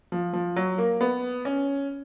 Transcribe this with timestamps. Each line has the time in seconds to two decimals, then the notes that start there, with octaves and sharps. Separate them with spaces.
0.12 F3
0.33 F3
0.56 F#3
0.78 A#3
1.01 B3
1.45 C#4